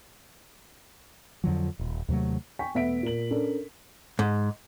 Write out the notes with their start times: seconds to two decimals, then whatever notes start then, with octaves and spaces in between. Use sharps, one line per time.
1.44 F2 D3 F3 F#3
1.79 D#1
2.09 D#2 C3 F#3 A3
2.59 G5 G#5 C#6 B6
2.74 E1 A3 B3 E5 B6 D7
3.03 A#2 A#4 F#7
3.31 C#4 D4 A4 A#4
4.19 G#2